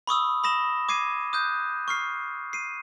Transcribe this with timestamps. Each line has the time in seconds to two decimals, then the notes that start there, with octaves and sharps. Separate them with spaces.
0.07 B5 C#6 D#6 E6
0.44 B5 D#6 A#6 E7 G7
0.89 D6 G#6 C7 D#7
1.33 D#6 F#6 G6
1.88 C#6 F6 C7
2.53 C7 D#7